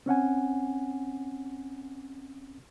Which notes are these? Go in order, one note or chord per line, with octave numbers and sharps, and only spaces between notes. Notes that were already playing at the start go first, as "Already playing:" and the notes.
C4 C#4 F#5 G#5